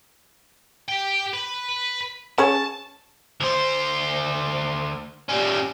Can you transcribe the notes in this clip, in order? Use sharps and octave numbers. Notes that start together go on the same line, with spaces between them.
G4 G5
B4
C#4 G#4 C#5 A5
D2 C5
G3 C#4